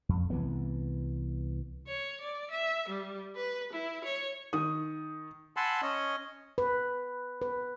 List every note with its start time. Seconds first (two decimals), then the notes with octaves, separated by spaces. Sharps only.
0.09 F2
0.30 C2 E3 B3
1.87 C#5
2.21 D5
2.51 E5
2.89 G3
3.36 B4
3.73 E4
4.04 C#5
4.53 D#3 D#6
5.57 F#5 G#5 A5 B5 C6 E6
5.82 C#4 D#5
6.58 B4
7.42 B4